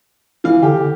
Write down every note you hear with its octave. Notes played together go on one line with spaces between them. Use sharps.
E3 F5
D3 G4
D3